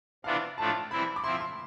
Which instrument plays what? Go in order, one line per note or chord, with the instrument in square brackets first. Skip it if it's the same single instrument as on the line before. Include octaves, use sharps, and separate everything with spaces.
[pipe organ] C3 E3 B3 D4 F4 [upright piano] F5
[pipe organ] A2 F3 A3 D4 F4 [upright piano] A5
[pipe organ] E3 G3 C4 E4 [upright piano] B5
[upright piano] D6
[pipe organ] F3 C4 E4 [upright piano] C6
[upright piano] C6